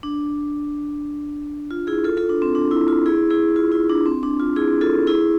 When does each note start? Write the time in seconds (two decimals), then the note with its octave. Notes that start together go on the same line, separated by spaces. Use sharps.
0.03 D4
1.71 F4
1.87 E4 G#4
2.04 F4 A4
2.17 F4 A4
2.29 D4
2.42 C4
2.55 D4
2.71 E4
2.88 F4
3.06 E4 G#4
3.30 E4 G#4
3.56 F4
3.72 E4
3.89 D4
4.06 C4
4.23 D4
4.40 F4
4.56 E4 G#4
4.81 F4 A4
5.07 E4 G#4